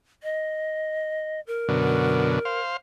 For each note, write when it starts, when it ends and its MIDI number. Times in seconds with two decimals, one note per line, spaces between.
0.23 1.40 75
1.47 2.60 70
1.69 2.39 42
1.69 2.39 47
1.69 2.39 50
2.45 2.77 72
2.45 2.77 77